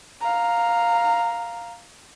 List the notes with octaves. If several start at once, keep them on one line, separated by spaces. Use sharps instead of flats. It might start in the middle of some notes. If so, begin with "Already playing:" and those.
F5 A#5